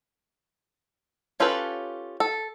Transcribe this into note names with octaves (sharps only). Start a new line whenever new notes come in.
C#4 F4 G4 A4 B4
A4